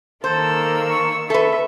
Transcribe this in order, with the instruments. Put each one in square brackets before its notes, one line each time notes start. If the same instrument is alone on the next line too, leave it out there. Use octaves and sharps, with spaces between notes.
[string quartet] D#3 A#3 E6 [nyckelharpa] A4 [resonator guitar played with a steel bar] C5
[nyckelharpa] C#6
[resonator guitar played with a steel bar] A4 B4 [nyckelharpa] E5